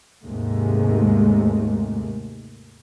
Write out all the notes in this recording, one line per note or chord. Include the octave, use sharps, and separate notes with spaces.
D#2 G#2 C3 G#3 A3